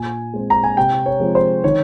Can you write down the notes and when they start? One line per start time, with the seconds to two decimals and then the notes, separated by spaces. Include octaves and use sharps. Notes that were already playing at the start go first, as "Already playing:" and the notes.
Already playing: A#2 G#5
0.34 G#3 C4
0.50 A#5
0.64 G#5
0.77 C3 G5
1.06 C#5
1.20 F3 G#3 C4
1.35 C5
1.64 D#3 C#5